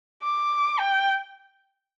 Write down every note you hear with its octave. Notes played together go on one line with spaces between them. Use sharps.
D6
G5